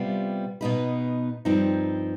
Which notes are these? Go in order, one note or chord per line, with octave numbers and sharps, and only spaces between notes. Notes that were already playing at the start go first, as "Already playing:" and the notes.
Already playing: C3 G3 B3 F4
B2 B3 D#4 B4
G2 F3 C4 D#4